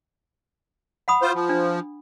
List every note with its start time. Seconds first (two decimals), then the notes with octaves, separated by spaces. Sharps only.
1.08 F#5 B5 D#6
1.22 F4 C5
1.35 F3
1.49 D4